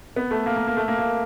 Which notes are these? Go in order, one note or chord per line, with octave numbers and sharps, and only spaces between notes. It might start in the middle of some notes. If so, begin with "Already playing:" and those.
B3
A3
A#3
A#3
A#3
A3
A#3
A#3